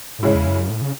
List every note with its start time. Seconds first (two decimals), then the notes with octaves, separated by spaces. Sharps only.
0.19 A2
0.22 G#2 C#3 G#3 C#4 E4
0.35 E2
0.46 F#2
0.70 A2
0.82 C#3